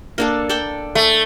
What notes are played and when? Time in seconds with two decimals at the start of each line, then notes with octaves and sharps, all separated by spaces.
0.18 A#3 D4 A4
0.49 A4 D5 G5
0.95 A3 G#5